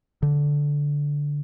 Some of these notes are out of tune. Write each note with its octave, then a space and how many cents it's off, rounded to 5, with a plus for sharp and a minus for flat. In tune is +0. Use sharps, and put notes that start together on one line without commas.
D3 -10